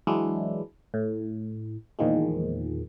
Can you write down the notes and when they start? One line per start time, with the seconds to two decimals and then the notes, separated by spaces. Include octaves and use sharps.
0.07 E3 F#3 G#3 D4 E4
0.94 A2
1.99 E2 A#2 D#3 F3 G#3